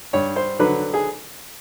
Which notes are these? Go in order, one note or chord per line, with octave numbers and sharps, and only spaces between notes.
G2 C#5
C5
D3 F#3 B4
G#4